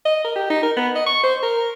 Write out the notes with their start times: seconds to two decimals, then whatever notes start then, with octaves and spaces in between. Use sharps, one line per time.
0.05 D#5
0.24 A#4
0.36 G4
0.50 D#4
0.63 A#4
0.77 B3
0.95 D#5
1.06 C#6
1.23 C5
1.43 A#4